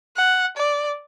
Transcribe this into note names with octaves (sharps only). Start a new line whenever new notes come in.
F#5
D5